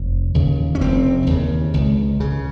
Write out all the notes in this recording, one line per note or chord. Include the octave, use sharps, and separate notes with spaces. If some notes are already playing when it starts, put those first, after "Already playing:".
Already playing: F1
D#2 C#3
C#4
F1 C4
D#2 C#3
C#2
C#3